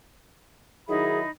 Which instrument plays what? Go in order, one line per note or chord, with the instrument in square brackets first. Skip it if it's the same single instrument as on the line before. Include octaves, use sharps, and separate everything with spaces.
[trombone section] D#3 F#3 E4 [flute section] D#4 B5 [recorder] G#4